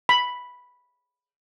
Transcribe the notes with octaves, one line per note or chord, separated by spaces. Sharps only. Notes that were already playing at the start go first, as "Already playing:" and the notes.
B5